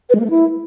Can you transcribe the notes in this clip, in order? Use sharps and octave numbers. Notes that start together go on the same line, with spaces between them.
B4
G#3
A#3
A3
E4